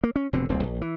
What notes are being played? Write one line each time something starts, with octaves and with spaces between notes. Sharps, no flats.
A#3
C#4
F1 B2 D3 C4
D1 C2 A#2 C4
A#1
E3